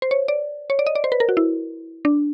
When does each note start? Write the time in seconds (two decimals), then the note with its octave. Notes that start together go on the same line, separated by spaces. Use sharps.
0.02 C5
0.11 C#5
0.28 D5
0.70 C#5
0.79 D5
0.86 D#5
0.95 D5
1.04 C5
1.12 B4
1.20 A#4
1.29 F#4
1.37 E4
2.05 D4